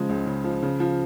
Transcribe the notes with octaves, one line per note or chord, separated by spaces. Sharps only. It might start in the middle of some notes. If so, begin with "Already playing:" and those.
Already playing: C#3 F3 G#3
C#2
C#3
F3
C#3
F3